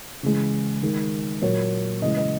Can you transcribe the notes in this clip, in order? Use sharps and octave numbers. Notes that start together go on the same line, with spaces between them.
C#3 E3 G#3
D#3 G#3
A#2 F#3 A#3 C#5
C#3 E3 G#3 D#5
D#5